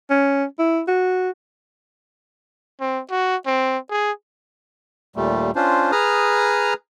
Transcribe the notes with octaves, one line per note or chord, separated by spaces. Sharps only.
C#4
E4
F#4
C4
F#4
C4
G#4
D#2 A#2 G3 A3
C#4 D4 F4 C5
G#4 B4 A#5 D#6 F6